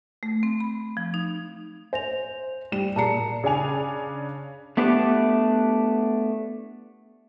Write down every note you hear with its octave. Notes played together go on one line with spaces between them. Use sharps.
A3
C4
B5
F3
D#4
C5 G#5 A#6 F7
G3 E7
A#2 G#4 A5 A#5 C7 C#7
C#3 D4 G#5 F7
A3 B3 D4 E4 G4 B4